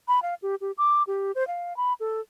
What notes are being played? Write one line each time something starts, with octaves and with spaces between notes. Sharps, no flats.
B5
F5
G4
G4
D6
G4
C5
F5
B5
A4